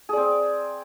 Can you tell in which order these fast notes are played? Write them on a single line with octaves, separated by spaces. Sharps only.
G#4 D5 C4